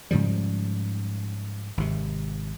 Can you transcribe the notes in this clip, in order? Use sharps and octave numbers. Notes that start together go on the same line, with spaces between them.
G#2 C#3 F3 G3
G#1 C3